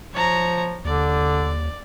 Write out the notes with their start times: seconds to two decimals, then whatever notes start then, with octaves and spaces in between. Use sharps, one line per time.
0.13 F3 C#5 A#5
0.85 D#2 D3 D5